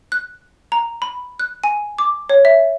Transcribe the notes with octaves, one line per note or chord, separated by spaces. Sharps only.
F#6
A#5
B5
F#6
G#5
D6
C#5
E5